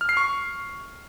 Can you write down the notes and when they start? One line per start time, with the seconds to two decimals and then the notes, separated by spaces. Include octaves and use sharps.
0.01 F6
0.09 C7
0.17 C#6